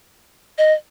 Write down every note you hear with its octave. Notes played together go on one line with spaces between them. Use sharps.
D#5